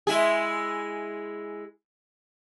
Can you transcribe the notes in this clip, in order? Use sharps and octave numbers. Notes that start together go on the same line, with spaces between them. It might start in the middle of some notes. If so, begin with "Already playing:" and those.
G#3 E4 G#4